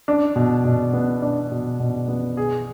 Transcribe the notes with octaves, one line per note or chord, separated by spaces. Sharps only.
D4
B2
B2
B3
D4
B2
B2
B3
G#4